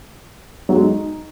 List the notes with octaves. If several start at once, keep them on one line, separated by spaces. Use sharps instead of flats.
F#3
G#3
D#4